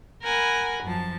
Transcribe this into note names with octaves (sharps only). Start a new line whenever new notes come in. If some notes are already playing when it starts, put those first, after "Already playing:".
A#4 F#5 G#5 B5
F#2 F3 A5